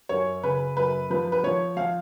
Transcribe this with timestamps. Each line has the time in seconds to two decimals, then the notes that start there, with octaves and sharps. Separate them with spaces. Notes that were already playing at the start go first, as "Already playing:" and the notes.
0.09 F#2 C#5
0.43 C#3 B4
0.77 F#2 B4
1.10 F3 B4
1.32 B4
1.43 F3 C#5
1.77 F3 F5